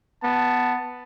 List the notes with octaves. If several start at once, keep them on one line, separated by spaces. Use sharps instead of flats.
B3 A5